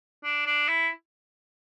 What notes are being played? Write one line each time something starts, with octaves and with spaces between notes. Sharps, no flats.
D4
D4
E4